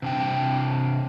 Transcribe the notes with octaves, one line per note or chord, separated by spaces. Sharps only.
C3 D4 G5